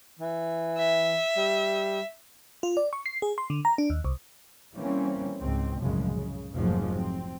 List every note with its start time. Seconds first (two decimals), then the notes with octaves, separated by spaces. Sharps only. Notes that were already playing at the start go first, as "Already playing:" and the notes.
0.19 E3
0.79 E5
1.37 G3
2.63 F4
2.77 D5
2.93 C#6
3.06 C7
3.22 G#4
3.38 C6
3.50 D3
3.65 A#5
3.78 D4
3.90 D#2
4.04 C2
4.74 E3 G3 A#3 C4 C#4
5.40 C#2 G#2 C4
5.81 C2 F#2 A2 C#3 F3 G#3
6.14 C#3
6.54 F1 G#2 F3 F#3 G#3 A#3
6.95 C4